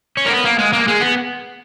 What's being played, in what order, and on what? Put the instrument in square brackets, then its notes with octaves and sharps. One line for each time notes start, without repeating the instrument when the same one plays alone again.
[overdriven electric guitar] C#4
A#3
B3
A#3
G#3
A#3
G#3
B3